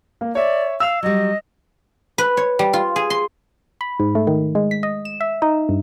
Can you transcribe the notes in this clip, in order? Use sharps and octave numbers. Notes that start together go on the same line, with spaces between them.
A#3
C#5 D5 E5
F5 E6 F7
F#3 G3 D#5
B4
C#5
G3
F4
G#4
C6
B5
G#2
A3
D#3
G#3
B6
D#5
E7
E5
D#4
G2